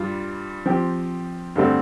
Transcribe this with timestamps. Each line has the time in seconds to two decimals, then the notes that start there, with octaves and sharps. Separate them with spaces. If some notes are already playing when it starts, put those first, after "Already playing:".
Already playing: G2 G3 F4
0.66 F3 C4 G4
1.56 G2 D3 A3 C4